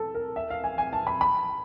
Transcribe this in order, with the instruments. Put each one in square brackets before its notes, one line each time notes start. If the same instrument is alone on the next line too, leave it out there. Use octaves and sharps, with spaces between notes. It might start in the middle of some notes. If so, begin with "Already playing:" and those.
Already playing: [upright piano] A4
A#4
E5
F5
G#5
G#5
A5
B5
B5